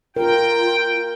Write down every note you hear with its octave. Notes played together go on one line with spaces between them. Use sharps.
F4 A#4 G5